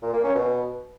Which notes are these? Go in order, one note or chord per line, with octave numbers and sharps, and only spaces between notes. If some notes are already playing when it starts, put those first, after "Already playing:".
A#2
A#3
C#4
B2